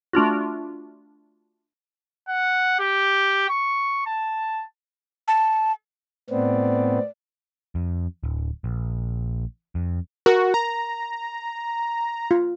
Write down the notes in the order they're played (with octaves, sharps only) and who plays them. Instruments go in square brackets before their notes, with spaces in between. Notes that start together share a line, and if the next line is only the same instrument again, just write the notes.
[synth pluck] A3 D4 F4 F#4
[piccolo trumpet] F#5
G4
C#6
A5
[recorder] A5
[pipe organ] A2 B3 C4 [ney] D5
[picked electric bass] F2
D1
A#1
F2
[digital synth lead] F#4 [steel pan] A#4
[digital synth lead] A#5
[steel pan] F4